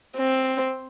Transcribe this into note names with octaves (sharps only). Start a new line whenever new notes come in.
C4